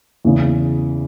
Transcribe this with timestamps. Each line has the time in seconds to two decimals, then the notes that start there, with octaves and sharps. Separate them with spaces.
0.25 E2 C#3 E3